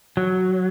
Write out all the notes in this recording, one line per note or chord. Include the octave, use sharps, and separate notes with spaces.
F#3